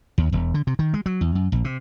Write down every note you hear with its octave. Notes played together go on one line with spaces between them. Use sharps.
D#2
E1
D3
C3
D#3
G#3
F#3
E2
F#2
A#1
C3